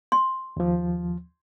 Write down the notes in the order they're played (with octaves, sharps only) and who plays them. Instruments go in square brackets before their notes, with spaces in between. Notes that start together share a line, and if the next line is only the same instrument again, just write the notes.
[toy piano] C6
[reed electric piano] D#2 F3